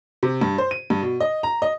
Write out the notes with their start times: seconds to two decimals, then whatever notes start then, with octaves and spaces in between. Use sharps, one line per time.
0.23 C3
0.41 G2
0.58 C5
0.71 D#7
0.90 G2
1.02 B2
1.20 D#5
1.43 A#5
1.62 D#5